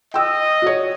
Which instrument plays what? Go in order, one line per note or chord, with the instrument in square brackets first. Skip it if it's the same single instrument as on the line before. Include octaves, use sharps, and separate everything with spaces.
[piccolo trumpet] D#5 [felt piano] G5 E6
[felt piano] F#4 C#5